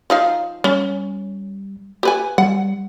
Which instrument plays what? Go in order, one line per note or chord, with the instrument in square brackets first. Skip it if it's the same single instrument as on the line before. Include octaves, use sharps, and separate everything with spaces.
[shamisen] F3 D#4 F5
[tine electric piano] G3 [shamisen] C#4
[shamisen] G4 B4 G#5
[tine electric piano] G3 [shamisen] F#5